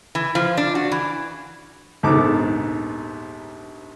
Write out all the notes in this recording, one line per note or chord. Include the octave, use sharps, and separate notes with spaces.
E3
F3
D4
F#4
E3
A#1 D#2 G#2 B3 A4 D6